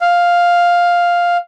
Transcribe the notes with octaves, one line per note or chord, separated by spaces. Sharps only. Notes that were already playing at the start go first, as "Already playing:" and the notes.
F5